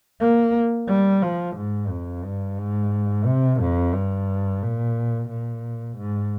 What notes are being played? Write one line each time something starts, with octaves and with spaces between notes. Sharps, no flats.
A#3
G3
F3
G#2
F2
G2
G#2
C3
F2
G2
A#2
A#2
G#2